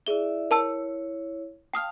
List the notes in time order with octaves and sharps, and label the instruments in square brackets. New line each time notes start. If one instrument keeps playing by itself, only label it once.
[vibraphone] E4 D5 E5 [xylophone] G#4 G7
[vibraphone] E4 C#5 [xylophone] A#4 A5 E6
[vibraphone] F5 A5 [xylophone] G5 D#6 F6